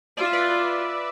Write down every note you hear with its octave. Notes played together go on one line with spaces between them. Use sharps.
F4 D5
E5
B4 D5